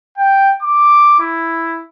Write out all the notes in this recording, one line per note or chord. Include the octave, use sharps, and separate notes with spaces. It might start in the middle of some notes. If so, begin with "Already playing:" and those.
G5
D6
E4